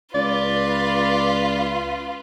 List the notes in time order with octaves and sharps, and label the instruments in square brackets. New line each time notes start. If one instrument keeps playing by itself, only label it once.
[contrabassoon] C#2 [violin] F4 B4 [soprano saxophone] D5